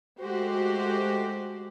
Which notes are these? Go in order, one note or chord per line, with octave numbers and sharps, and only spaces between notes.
G#3 A3 F#4 G4 C5